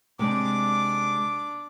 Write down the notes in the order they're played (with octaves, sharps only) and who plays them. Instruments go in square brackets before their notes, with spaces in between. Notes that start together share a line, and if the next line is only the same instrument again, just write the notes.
[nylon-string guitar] C3 G#3 [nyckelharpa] D4 D6